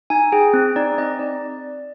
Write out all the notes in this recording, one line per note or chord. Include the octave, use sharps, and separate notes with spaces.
D#4 G#5
G#4 G5
C4
D#4 D5
C4 D#5
D#4 D5